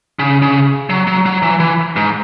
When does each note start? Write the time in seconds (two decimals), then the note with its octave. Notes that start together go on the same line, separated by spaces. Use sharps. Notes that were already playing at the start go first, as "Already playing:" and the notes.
0.19 C#3
0.42 C#3
0.90 F#3
1.07 F#3
1.26 F#3
1.42 E3
1.60 E3
1.96 G#2